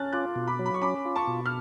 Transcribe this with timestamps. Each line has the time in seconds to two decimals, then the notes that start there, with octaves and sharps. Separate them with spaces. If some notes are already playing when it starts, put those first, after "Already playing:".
Already playing: C#4 A5 F6 F#6 A6
0.13 F4 D6 F#6
0.36 B2
0.47 B5 D6
0.59 F#3
0.66 B5
0.74 C#6
0.82 C#4 B5 D6
1.05 F4
1.16 A5 C#6
1.27 B2
1.46 F6